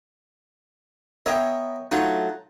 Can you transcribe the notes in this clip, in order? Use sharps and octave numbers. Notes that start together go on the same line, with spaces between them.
B3 A#4 C#5 D#5 E5 G5
F#3 A3 D#4 F4 F#5